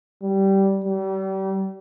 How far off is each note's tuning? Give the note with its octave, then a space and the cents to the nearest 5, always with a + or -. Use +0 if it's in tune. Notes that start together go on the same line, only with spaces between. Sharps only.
G3 -15
G3 -35